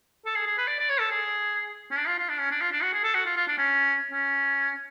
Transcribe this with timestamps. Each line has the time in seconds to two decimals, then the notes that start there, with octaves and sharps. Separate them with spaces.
0.26 A4
0.36 G#4
0.46 G#4
0.58 B4
0.67 D5
0.79 D5
0.89 C#5
1.00 A4
1.11 G#4
1.91 C#4
1.97 D4
2.07 F4
2.18 F4
2.29 D4
2.40 C#4
2.51 D4
2.61 F4
2.72 D4
2.82 F#4
2.94 G#4
3.04 A4
3.14 F#4
3.26 F4
3.36 F4
3.48 D4
3.58 C#4
4.11 C#4